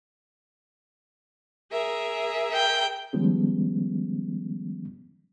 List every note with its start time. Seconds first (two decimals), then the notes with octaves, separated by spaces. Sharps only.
1.71 G#4 A#4 E5
2.54 G5
3.13 D#3 F3 G3 G#3 B3 C#4